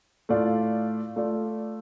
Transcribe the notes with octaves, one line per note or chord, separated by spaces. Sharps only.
A2 A3 F4 D5 F5
A3 F4 D5